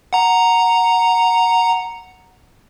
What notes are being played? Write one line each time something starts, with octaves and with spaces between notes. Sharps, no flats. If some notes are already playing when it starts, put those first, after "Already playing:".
F#5 A#5